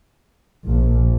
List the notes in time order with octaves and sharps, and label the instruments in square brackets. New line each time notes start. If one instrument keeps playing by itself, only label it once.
[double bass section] A#1 A#2